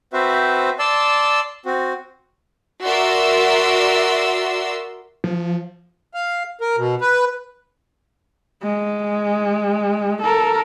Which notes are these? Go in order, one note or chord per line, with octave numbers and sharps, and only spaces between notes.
C4 F#4 B4 C5 E5
D5 A5 C6 E6
C4 F#4
F#4 A#4 D5 E5 C6 E6
F3
F5
A#4
B2
B4
G#3
A4 A#4